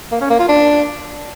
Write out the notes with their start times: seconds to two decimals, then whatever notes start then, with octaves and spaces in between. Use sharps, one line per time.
0.12 A#3
0.21 C#4
0.30 A#3
0.39 F4
0.49 D4